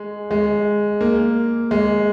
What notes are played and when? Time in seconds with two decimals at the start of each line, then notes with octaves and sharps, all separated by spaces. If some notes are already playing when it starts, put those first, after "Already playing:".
Already playing: G#3
0.31 G#3
1.01 A#3
1.71 G#3